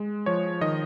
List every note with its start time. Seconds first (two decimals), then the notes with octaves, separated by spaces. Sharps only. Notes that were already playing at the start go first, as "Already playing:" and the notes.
Already playing: G#3
0.26 F3 C#5
0.61 D#3 D#5